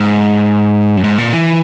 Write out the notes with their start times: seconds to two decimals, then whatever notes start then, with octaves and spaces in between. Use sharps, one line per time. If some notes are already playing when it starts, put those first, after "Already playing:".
Already playing: G#2
0.97 F#2
1.04 G#2
1.18 A#2
1.33 E3